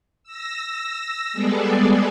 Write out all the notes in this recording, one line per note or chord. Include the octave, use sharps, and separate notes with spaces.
E6 A#6
G3 G#3 B3 G#4 A4 D5